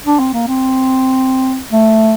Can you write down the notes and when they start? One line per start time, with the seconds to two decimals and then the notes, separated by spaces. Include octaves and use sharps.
0.06 D4
0.19 C4
0.34 A#3
0.47 C4
1.72 A3